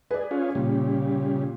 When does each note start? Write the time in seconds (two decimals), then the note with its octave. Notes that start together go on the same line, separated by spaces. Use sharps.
0.11 G#4 B4 D5
0.31 C#4 F4 G#4
0.55 A#2 C#3 G3